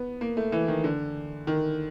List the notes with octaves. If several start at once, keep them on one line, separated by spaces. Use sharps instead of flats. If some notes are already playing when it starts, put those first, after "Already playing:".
Already playing: B3
A#3
A3
E3
D#3
D3
D#3